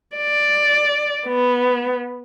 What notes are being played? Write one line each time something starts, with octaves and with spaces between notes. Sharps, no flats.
D5
B3